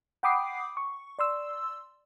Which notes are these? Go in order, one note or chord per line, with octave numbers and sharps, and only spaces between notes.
F#5 G5 B5 D6 D#6 C7
C#6
D5 C6 E6